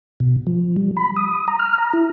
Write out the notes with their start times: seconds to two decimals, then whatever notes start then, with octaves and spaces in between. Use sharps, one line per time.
0.20 B2
0.47 F3
0.76 G3
0.97 B5
1.17 D#6
1.48 A#5
1.59 F6
1.78 A#5
1.93 E4